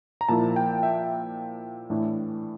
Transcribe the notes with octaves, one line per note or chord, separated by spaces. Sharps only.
A#5
A#2 F3 A#3 E4 A5
G5
E5
A2 E3 A3 D4